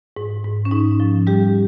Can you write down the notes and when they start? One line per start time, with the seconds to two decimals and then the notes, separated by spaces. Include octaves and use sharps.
0.17 G#2
0.44 G#2
0.65 C#4
0.71 G#2 D#4
1.00 F3
1.27 G3 G4